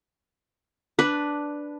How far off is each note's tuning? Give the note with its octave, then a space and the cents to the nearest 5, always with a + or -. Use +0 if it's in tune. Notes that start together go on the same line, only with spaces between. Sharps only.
D4 +0 B4 +0